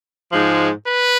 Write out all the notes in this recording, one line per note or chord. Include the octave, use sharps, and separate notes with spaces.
G#2 F3 G#3
B4